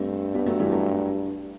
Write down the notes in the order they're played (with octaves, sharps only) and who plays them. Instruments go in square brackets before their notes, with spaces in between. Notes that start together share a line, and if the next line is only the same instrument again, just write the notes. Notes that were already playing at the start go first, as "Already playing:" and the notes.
Already playing: [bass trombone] G2 [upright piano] A3 C4
[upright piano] G3 B3
F#3 A3
E3 G3
F#3 A3